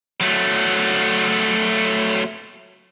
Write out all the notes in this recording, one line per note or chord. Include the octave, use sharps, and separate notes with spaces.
F#3 A3